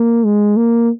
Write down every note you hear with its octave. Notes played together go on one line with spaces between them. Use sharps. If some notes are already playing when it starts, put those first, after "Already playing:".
Already playing: A#3
G#3
A#3